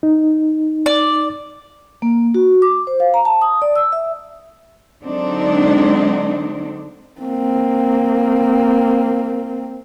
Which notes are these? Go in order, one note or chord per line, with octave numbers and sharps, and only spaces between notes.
D#4
D5
A#3
F#4
D6
C5
F5
A#5
A5
D#6
D5
E6
E5
D3 F#3 G#3 C4 D4 D#4
A#3 C4